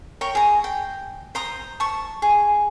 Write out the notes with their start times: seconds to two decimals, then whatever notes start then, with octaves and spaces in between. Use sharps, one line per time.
0.21 A#4 C#5 G5
0.35 G#4 A#5
0.64 G5
1.35 C5 A#5 D#6
1.80 A5 C#6
2.22 G#4